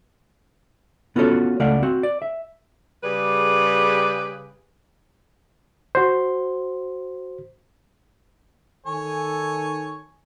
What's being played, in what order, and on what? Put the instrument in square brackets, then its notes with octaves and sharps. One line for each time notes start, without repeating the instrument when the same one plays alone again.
[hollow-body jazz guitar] B3 C#4 F4 F#4 A4 C#5
C#2 A3 D5 F5 F#5
C4 F#4
D5
E5
[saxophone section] C#3 G3 G4 G#4 B4
[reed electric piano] F#4 C5
[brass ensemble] D#3 A4 G#5 [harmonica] C#5